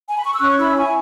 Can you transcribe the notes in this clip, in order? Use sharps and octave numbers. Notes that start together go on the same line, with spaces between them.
G#5
B5
C#6
E6
C#4 C#6 F#6
E4 B5 E6
E4 G#5 C#6